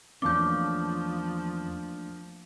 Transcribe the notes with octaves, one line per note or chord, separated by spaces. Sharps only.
E2 F3 A3 A#3 C#4 D4 D6 G6